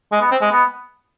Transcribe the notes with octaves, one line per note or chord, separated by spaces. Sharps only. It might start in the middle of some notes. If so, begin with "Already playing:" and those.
G#3
B3
C4
G#3
B3